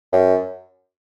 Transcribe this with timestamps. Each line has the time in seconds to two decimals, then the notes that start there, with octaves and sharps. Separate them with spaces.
0.12 F#2